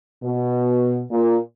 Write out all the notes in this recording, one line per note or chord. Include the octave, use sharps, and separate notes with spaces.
B2
A#2